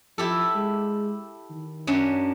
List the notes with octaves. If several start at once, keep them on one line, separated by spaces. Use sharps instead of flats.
F3 E4 G4 A4
G#3
D#3
F#2 C#4 D4